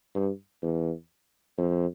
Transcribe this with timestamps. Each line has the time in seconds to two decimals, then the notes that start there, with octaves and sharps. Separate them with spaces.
0.15 G2
0.62 E2
1.58 F2